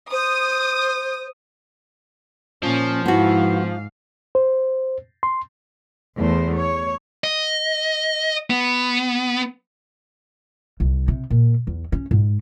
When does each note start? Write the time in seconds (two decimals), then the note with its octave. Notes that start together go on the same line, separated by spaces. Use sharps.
0.12 C5 D#6
2.63 A#2 F3 C#4
3.06 G#2 B3 E4 F#4 F5
4.35 C5
5.23 C6
6.16 E2 A3 C5
6.56 C#5
7.24 D#5
8.50 B3
10.80 C2
11.08 C3
11.30 A#2
11.67 E2
11.92 C#4
12.11 G#2 G#3